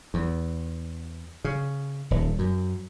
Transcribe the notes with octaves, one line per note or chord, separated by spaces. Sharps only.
E2
C#3
D#1
F#2